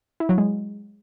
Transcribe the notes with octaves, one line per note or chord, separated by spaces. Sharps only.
E4
F#3
G#3